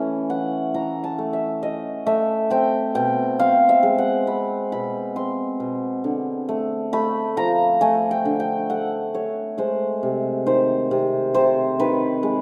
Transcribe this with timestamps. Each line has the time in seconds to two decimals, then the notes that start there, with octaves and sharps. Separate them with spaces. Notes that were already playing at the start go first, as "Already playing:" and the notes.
Already playing: E3 A3 C#4
0.29 E3 F#5
0.74 E3 A#5
1.04 A5
1.18 A3
1.33 E5
1.62 C#4 D#5
2.06 A3 E5
2.50 C4 G5
2.95 B2 G5
3.39 C4 F5
3.69 E5
3.83 G#3
3.98 F#5
4.27 C4 B5
4.72 B2 B5
5.16 C4 C6
5.60 B2
6.04 D3
6.49 A3
6.93 A3 B5
7.37 F3 A#5
7.81 A3 G#5
8.11 G5
8.25 D3
8.40 G5
8.70 A3 F#5
9.14 A3 C#5
9.58 G#3 C5
10.03 C3
10.46 D#3 C5
10.91 C3
11.34 C3 C5
11.80 D#3 B4
12.23 G#3